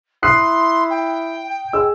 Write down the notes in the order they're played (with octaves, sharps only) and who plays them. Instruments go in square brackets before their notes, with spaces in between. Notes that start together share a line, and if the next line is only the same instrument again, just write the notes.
[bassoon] E4 [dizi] C6 [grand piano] D#6 F#6 C7
[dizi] G5
[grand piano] G#4 D#5 E6